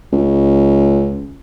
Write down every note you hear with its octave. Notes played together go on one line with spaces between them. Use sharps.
C#2